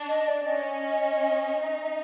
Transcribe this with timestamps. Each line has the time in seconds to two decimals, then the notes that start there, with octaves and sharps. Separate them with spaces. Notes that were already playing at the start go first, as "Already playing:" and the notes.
Already playing: D4
0.08 D#5
0.28 D5
0.46 C#4 D#5
1.63 D#4